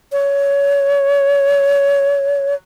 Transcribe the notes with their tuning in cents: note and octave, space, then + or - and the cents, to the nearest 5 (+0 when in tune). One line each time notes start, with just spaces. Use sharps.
C#5 +20